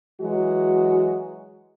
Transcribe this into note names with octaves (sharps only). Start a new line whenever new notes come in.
E3 F#3 G#3 F#4